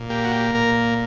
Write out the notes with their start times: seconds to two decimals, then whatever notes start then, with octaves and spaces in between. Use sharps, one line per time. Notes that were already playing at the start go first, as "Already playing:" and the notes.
Already playing: A#2
0.10 A#3 G4
0.24 F#4
0.32 G4
0.55 A#2 A#4